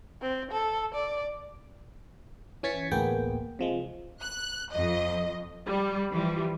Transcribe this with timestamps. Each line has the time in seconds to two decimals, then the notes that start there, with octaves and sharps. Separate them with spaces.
0.21 C4
0.51 A4
0.95 D5
2.63 E3 C#4 G#6 A6 B6 C#7
2.91 A1 D2 A#3 B3 G#4 G5
3.59 C3 F3 G#3
4.21 F#6
4.71 F2 D#5
5.67 G3
6.11 E3 F3 G3